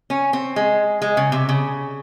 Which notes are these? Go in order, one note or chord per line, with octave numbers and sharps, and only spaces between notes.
C#4
C4
G#3
G#3
C#3
C3
C#3